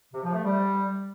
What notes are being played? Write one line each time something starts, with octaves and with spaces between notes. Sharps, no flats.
C3
F3
A3
G3